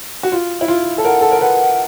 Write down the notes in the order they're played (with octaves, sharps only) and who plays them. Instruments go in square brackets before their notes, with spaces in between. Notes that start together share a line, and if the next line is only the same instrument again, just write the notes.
[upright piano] F#4
F4
E4
F4
A4
[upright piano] A#4 [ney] F#5
[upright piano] A4
A#4
[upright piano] B4 [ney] F#5